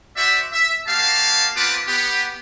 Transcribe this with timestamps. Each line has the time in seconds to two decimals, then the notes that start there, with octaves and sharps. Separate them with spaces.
0.17 F#4 C5 D5 E5
0.53 E5
0.87 A#3 F#4 G4 F5 A5
1.56 B3 C4 F4 B4 A5 D6
1.88 B3 G4